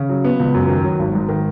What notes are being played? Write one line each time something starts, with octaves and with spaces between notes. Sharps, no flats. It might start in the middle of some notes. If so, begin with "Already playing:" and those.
Already playing: C#3
F#3
B3
C#2
F#2
D#3
F#3
G#1
G#2
D#3